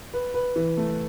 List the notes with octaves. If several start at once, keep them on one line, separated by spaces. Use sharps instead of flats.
B4
B4
E3
A3